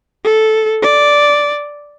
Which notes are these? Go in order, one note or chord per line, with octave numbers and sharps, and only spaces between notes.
A4
D5